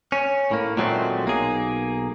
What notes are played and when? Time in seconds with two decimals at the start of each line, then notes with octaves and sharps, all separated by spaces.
0.12 C#4
0.51 A2 A#3
0.77 A#2 D#3 F#3 G#3 A3 C4
1.25 B1 A#3 G#4